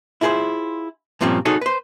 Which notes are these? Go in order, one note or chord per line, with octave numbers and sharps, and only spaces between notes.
E4 F4 G#4 A#4 C5
G2 A#2 F3 C4 C#4
D#4 F#4 G#4 A4 C#5
B4 C5